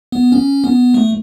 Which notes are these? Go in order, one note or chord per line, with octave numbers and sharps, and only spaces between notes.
B3
C#4
B3
A3